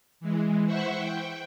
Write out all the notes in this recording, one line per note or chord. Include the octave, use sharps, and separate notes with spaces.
E3 G#3
E4 C5 E5 F#5 C#6
G5